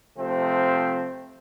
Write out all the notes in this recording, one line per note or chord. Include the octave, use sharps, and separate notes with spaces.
C3 F3 A3 C4